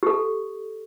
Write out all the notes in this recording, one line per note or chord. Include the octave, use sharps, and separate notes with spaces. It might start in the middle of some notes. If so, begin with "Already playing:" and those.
G4 A4